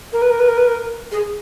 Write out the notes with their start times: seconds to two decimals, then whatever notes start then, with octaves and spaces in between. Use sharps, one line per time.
0.13 A#4
0.22 B4
0.31 A#4
0.40 B4
0.48 A#4
0.57 B4
0.67 A#4
1.12 G#4